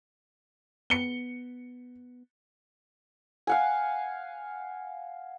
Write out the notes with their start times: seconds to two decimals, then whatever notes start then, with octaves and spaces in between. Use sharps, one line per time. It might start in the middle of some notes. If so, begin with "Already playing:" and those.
0.90 B3 C#7 G7
3.47 F5 F#5 G#5